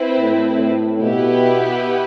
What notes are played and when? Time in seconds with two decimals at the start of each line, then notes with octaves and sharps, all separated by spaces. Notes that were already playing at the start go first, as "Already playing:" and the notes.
Already playing: C4 E4 B4
0.20 A2
0.61 A2
1.01 B2 B3 E4 G4 B4